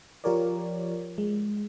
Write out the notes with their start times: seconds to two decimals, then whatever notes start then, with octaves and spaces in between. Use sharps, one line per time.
0.24 F3 F4 G4 A#4 C#5 D5
1.18 G#3